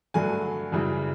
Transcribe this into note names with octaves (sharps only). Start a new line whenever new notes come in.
G2 D3 F#3 A3 G#5
F#2 C#3 E3 G3